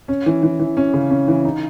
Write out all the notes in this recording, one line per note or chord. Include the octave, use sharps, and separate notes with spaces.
C#4
E3
E3
E3
C#4
C#3
C#4
E3
D#4